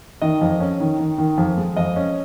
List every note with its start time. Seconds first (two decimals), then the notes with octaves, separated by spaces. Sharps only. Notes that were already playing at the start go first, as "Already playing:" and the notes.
0.22 D#3 D#5
0.41 F2
0.60 C#4
0.80 D#3
0.99 D#3
1.18 D#3
1.38 F2
1.57 G#3
1.76 F2 D#5
1.96 C#4